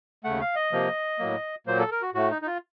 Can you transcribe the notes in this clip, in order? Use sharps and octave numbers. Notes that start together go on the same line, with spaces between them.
D#2 C#3 A3 F#5
F5
D#5
C3 F3 A#3
A2 F#3 A#3
A#2 F#3 A#3 C5
A4
A#4
F#4
A2 A3 F#4
D#4
D#4
F4